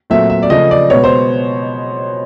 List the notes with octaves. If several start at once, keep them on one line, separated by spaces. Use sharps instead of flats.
A#2 F#3 A3 C4 E5
E5
D5
C#3 F3 A3 D#5
D5
B2 G#3 B3 C#5
C5